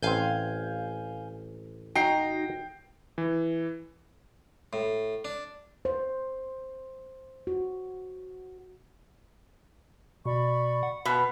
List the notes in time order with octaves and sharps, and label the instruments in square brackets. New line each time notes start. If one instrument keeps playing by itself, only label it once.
[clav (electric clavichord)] A1 C4 [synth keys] F5 G#5 G6
[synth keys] D#4 F#4 A#6 [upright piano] G5 C7
[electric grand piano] E3
[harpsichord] A2
D4
[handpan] C5
F#4
[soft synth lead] B2 [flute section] D5 B5 C#6
[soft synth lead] F#5
[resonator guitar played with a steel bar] B2